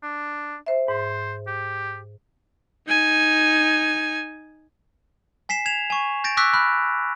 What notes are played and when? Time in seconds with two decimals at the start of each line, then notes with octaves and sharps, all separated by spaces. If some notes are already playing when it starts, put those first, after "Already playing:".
0.03 D4
0.66 C5 E5
0.88 G#2 C5
1.47 G4
2.88 D#4 G#5
5.49 G#5 B6 C7 E7
5.66 G#6 E7 F7
5.90 G#5 C#6
6.24 G6 A6 A#6 D7
6.37 C#6 D6 E6 F#6 A#6 B6
6.53 B5 F6 F#6